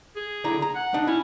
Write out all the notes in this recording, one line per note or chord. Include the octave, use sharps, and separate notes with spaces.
G#4
D3 E4 A#5
A#5
F#5
D4 D#4
C#4 E4